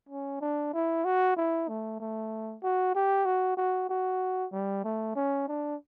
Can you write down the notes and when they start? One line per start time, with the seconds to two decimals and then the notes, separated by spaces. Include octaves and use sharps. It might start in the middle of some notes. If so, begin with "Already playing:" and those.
0.09 C#4
0.41 D4
0.73 E4
1.05 F#4
1.37 E4
1.68 A3
2.00 A3
2.63 F#4
2.95 G4
3.26 F#4
3.57 F#4
3.89 F#4
4.53 G3
4.84 A3
5.16 C#4
5.48 D4